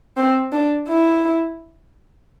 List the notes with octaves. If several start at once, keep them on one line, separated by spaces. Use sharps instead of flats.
C4
D4
E4